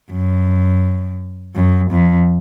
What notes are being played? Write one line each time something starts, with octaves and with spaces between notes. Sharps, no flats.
F#2
F#2
F2